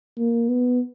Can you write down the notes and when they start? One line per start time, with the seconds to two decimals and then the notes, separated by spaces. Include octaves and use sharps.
0.18 A#3
0.49 B3